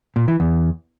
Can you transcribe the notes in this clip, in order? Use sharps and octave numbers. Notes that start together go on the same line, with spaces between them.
A#2
E3
E2